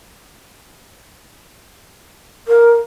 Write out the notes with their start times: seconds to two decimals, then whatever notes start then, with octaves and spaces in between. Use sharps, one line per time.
2.48 A#4